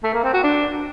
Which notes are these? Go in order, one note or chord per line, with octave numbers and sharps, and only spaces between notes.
A3
A#3
C4
F#4
D4